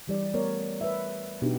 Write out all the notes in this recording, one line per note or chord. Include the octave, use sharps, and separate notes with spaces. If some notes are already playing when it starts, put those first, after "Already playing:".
E3 G3 D5
A3 B3 A#4 C#5 D5
B4 E5
B2 B3 D4 D#4 G4